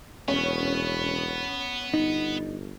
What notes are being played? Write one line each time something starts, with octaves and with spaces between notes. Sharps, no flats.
E1 B3 C#4
G1 D#4